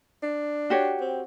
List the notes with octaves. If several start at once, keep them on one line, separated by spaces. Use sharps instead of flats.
D4
F#4 G4 C#5
C4